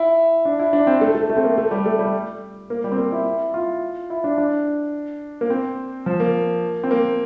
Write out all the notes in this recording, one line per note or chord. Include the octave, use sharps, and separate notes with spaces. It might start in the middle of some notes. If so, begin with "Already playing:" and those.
Already playing: E4
D4
E4
D4
C4
A3
A3
A3
C4
A#3
A3
G3
A3
G3
A#3
G3
C4
A#3
E4
F4
E4
D4
D4
A#3
C4
F3
A#3
C4
A#3